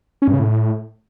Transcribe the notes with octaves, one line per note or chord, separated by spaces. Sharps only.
C#4
G2
C#3
A2